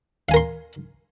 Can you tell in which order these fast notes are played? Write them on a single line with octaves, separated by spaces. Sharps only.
F5 G#5 A#4 C6